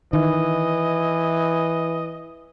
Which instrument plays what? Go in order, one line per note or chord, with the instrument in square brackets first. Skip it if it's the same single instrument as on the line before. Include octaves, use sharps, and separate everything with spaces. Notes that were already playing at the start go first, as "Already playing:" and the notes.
[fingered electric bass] D#3 [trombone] E3 [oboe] D#5